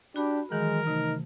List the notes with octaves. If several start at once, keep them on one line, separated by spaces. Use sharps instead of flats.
D4 F#4 G4 B5 F#6
D#3 E3 F#3 G#3 A#4
C3 A3 D#4